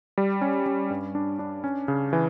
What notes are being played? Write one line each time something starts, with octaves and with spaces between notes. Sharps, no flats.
G3
C#4
C#4
G2
D4
D4
C#4
C#3
E3